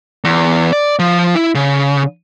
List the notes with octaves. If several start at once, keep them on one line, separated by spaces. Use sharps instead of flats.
E2
D5
F3
E4
C#3